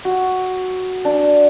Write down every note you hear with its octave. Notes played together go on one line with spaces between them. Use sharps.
F#4
D4